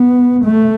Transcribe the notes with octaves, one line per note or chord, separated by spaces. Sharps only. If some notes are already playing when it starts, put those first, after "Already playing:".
Already playing: B3
A3